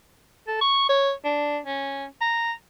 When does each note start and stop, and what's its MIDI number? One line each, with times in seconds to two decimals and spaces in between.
0.48 0.56 69
0.61 0.89 85
0.89 1.12 73
1.25 1.59 62
1.66 2.05 61
2.21 2.52 82